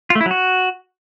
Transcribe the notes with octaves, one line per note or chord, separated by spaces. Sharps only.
F4
A3
E4
F#3
F#4